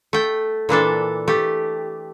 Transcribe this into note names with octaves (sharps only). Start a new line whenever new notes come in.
A3 G5
A#2 E3 D4 A4
A3 G4